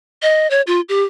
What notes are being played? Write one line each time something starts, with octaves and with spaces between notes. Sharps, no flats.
D#5
C#5
F4
G4